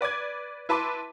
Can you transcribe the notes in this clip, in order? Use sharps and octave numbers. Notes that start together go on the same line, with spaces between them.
B4 D5 D6 G#6
E4 B4 A5 B5 C6 D6